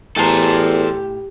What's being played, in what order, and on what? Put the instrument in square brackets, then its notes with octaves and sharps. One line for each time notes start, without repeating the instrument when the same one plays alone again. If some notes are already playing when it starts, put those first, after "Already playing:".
[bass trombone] E2 [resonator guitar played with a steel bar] A2 G#5 A#5 [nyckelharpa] G4 [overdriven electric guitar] A4 C5